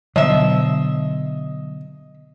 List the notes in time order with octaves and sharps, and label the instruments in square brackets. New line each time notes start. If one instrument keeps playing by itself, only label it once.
[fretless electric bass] B2 D3 [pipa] F3 E5 [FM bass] F#3 [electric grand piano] D#5